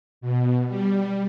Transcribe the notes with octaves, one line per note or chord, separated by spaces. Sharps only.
B2
G3